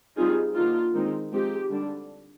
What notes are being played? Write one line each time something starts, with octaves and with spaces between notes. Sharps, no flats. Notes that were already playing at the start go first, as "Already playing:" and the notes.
G3 C4 D#4 F4 G#4
D3 F3 A#3 D#4 F4
D#3 G#3 C4 D#4
F3 G#3 C4 D#4 G4
D3 G3 D4